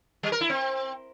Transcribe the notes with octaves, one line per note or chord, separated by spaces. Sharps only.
G3
A#4
E4
C4